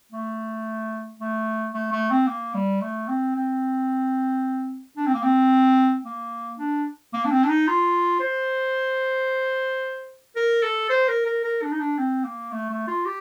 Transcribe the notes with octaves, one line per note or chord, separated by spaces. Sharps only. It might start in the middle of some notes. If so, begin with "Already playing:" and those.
A3
A3
A3
A3
C4
A#3
G3
A3
C4
C4
D4
C4
A#3
C4
A#3
D4
A#3
D4
C4
D4
D#4
F4
C5
A#4
A4
C5
A#4
A#4
A#4
D4
D#4
D4
C4
A#3
A3
A3
F4
G4